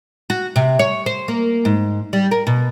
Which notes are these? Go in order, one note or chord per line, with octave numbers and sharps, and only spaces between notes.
F#4
C3
C#5
C5
A#3
G#2
G3
A#4
B2